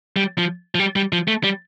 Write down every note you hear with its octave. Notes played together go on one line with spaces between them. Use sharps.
G3
F3
F3
G3
G3
F3
A3
G3